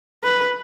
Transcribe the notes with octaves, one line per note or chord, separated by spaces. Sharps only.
B4